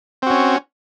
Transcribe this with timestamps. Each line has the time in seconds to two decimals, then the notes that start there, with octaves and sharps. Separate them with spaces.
0.22 C4
0.26 F#4
0.30 C#4